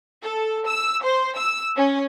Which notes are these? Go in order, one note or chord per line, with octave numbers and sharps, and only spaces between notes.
A4
E6
C5
E6
C#4